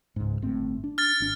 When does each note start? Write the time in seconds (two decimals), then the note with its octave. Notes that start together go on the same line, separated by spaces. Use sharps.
0.16 C#2 G#2
0.42 G1 A2 C4
0.84 D4
0.98 F6 A6
1.20 G#1 D4